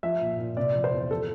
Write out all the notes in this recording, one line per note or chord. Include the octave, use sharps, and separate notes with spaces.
F3 E5
A#2
A#2
C3 D5
F3
C5
E2
F3 A4